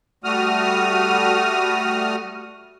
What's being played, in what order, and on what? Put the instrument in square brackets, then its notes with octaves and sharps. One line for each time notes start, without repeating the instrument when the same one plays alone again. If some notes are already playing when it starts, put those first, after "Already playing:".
[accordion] G3 A3 F#4 D#6 F6